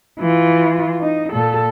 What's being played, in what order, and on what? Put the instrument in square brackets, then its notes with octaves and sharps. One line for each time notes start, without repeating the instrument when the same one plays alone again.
[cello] E3 F4
D#4
A#2 A4